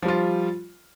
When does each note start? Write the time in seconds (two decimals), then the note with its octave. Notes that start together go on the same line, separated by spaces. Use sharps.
0.02 F3
0.05 G3
0.08 F4